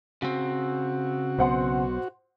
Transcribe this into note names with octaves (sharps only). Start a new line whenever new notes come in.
C#3 C4 F#4
B1 B3 C5 F#5 C6